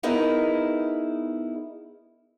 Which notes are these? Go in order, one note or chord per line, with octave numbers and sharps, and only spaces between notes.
B3 D#4 E4 G#4 A#4